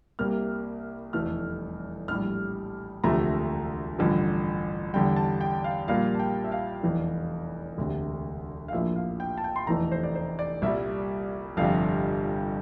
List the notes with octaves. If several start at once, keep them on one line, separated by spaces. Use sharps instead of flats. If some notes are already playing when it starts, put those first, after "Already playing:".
C2 C3 G3 A#3 F6
F1 E2 E3 A3 F6
A#1 A2 G3 F6
E1 D2 C3 F3 A3 A#5
A1 G2 D3 F3
E2 D3 G3 G5
A5
G5
F5
A#1 A#2 G3 A#3 F5
A5
G5
E5
F5
F1 E2 E3
E1 D2 C3
F5
A#1 A2 F3 A#3 E5
F5
G5
A5
G5
C6
F1 E2 E3 A3 A#5
C5
D5
C5
D5
C2 A#2 G3 E5
G1 F2 C3 G3 F5